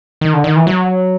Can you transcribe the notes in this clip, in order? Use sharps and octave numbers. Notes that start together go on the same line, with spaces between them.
D#3
D3
D#3
E3
F#3